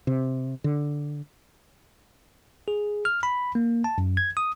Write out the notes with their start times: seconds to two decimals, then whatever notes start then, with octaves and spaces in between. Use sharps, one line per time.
0.07 C3
0.64 D3
2.68 G#4
3.05 F6
3.23 B5
3.55 A#3
3.84 A5
3.98 F#2
4.17 G#6
4.37 D#6